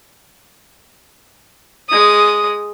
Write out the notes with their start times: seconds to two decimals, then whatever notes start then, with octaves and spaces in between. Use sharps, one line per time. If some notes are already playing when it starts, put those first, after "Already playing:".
1.89 G#3 D#6